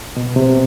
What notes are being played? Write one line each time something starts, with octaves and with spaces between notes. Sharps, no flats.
B2
C3